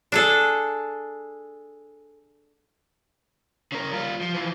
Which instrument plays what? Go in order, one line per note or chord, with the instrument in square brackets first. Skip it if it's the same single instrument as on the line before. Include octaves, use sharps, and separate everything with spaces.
[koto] D4 G#4 A4
[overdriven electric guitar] C#3 A#4
G3 F4
F3
E3 F3